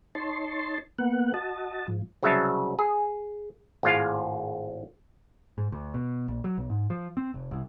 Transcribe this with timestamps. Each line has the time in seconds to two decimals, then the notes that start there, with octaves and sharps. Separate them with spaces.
0.15 D#4 C#5 A5 C6
0.98 A#3 B3 F#5
1.34 F#4 D#5 A5
1.88 G#2 F3
2.22 C2 C#3 F#3 C#5 E5 A5
2.79 G#4
3.83 G#1 A2 G#3 F4 F5
5.58 G#2
5.72 D2
5.94 B2
6.28 A#1
6.44 F#3
6.58 B1
6.70 G#2
6.90 F3
7.17 C4
7.34 F1
7.51 C2